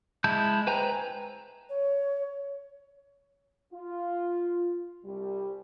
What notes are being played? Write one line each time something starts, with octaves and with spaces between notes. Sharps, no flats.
G#3 E4 A5 G6
B4 C5 G5 G#5 A#5
C#5
F4
C2 G3